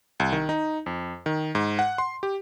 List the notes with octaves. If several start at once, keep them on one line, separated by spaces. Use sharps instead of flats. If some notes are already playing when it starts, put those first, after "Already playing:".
C2
D#3
D#4
F2
D#3
G#2
F#5
C6
G4